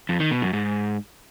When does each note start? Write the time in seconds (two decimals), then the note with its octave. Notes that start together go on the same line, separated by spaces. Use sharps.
0.09 F2
0.20 D#3
0.31 B2
0.42 F#2
0.53 G#2